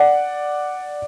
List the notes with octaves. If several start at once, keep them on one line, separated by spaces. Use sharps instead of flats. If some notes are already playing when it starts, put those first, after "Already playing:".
Already playing: D5 F#5